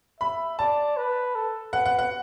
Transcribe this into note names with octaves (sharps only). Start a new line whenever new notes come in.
E5 B5
D5 A5
B4
A4
B4 F#5
F#5
F#5